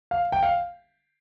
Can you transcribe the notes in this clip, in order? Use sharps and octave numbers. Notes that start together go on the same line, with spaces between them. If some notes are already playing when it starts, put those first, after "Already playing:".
F5
G5
F5